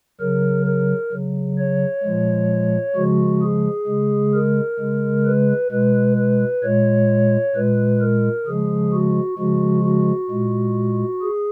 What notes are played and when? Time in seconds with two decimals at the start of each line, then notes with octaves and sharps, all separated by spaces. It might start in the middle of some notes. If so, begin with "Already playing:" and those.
0.20 C#3 F#3 A#4
0.66 A#4
1.12 C#3 F#3
1.58 C#5
2.03 A#2 F3 G#3
2.95 C#3 F3 G#3 F#4
3.42 G#4
3.87 C#3 G#3
4.34 A#4
4.79 C#3 G#3
5.26 B4
5.71 B2 G#3 B4
6.17 B4
6.63 A#2 G#3 C#5
7.55 A#2 G#3 B4
8.01 A#4
8.46 C#3 F3 G#3 G#4
8.93 F#4
9.38 C#3 F3 G#3 F#4
9.84 F#4
10.30 A#2 G#3
11.22 G#4